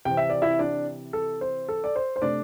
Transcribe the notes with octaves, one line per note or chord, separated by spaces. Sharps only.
C3 E3 C4 G5
E5
D5
E4 E5
D4 D5
A4
C5
A4
D5
C5
C5
C3 A3 D4 D5